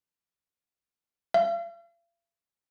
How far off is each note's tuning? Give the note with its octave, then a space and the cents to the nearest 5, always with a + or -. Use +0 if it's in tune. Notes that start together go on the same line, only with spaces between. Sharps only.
F5 -45